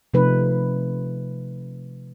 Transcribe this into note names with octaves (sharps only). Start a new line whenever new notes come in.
C3 F3 A3 D#4 B4